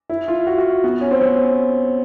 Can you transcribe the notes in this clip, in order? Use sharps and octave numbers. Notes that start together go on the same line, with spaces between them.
E4
F4
F#4
F#4
B3
C#4
C4
B3